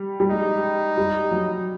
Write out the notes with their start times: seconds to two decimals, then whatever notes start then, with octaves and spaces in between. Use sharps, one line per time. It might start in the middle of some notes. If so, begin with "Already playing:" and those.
Already playing: G3
0.20 G3
0.31 G#3 D#4
0.97 G3
1.31 F#3